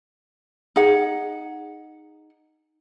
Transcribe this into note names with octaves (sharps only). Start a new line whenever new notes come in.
D#4 G#4 F#5